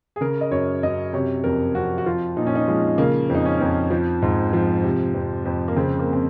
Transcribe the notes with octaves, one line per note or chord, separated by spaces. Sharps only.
G#4
C#3 A#4
D#5
F#2 C#5
F#2 D#5
C3 C#5
F2 A#4
F2 F#4
F#4
F3 F4
A#2 D#4
C#4
D#4
F3 G#3
C#3 A#3
F2
D#4
C#4
F2
F3
G#2
F3
C3
F2
F2
A#3
C#3 C4
A#3
C4